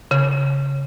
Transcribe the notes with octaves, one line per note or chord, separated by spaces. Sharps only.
C#3